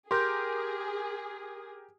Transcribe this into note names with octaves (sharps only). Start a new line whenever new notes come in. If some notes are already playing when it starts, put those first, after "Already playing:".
G4 G#4 A#4 C6 G6